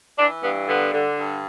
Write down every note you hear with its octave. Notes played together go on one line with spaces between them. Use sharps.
E3 D4
G2 B3
D3 B3
D3
G2